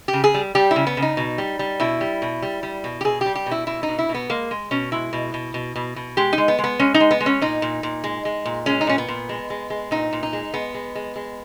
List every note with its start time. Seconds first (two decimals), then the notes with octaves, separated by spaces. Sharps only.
0.08 G4
0.13 C#3
0.24 G#4
0.34 G3
0.55 G3 G4
0.71 E4
0.76 C#3
0.87 B3
0.97 C#3
1.02 D#4
1.17 B2
1.38 G3
1.59 G3
1.80 B2 E4
2.01 G3
2.22 B2
2.42 G3
2.63 G3
2.84 B2
3.01 G4
3.04 B2 G#4
3.21 G3 G4
3.35 G4
3.46 B2
3.51 E4
3.67 B2 E4
3.83 D#4
3.88 B2
3.99 E4
4.09 B2
4.14 B3
4.29 G#3 A#3
4.51 G#3
4.71 B2 C#4
4.92 G#3 E4
5.13 B2
5.34 B2
5.54 B2
5.76 B2
5.96 B2
6.17 G#3 G4
6.33 D#4
6.38 G#3
6.48 B3
6.59 G#3
6.64 B3
6.79 G#3 C#4
6.94 D#4
7.00 G#3
7.11 B3
7.21 G#3
7.26 C#4
7.41 A#2 D#4
7.62 A#2
7.83 A#2
8.04 G#3
8.25 G#3
8.46 A#2
8.66 G#3 C#4
8.81 D#4
8.87 A#2 C#4
8.98 B3
9.08 A#2
9.29 G#3
9.50 G#3
9.70 G#3
9.91 A#2 D#4
10.13 A#2
10.23 D#4
10.33 G#3
10.54 G#3 B3
10.74 G#3
10.95 G#3
11.16 G#3